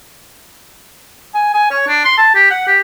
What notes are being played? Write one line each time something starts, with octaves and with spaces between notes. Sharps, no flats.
G#5
G#5
C#5
D4
C6
A5
G4
F#5
G4